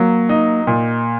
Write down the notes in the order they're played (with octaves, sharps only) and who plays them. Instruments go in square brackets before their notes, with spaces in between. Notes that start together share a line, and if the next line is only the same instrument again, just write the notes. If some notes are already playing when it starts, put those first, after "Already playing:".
Already playing: [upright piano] F#3 [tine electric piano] A#3
[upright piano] D#4
A#2